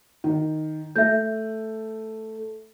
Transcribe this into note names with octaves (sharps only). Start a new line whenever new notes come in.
D#3
A3 E5 G6